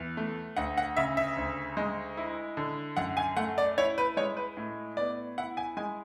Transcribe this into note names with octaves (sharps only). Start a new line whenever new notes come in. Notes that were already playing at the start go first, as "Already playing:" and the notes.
Already playing: E2
A3
D2 F#5
F#5
C#3 E5
E5
D2
G#3
E4
D3
F#2 F#5
G#5
A3 F#5
D5
E4 C#5
B4
G#3 C#5
B4
A2
B3 D5
E4 F#5
G#5
G#3 G#5